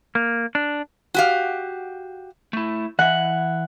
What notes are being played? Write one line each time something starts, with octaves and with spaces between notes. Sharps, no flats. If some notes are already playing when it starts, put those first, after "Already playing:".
A#3
D4
F#4 G4 F5
A3 E4
E3 E5 F#5